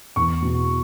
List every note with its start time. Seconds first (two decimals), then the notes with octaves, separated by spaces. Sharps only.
0.16 E2 C#6
0.42 B2